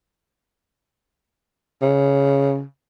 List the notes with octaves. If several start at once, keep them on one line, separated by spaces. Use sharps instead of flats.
C#3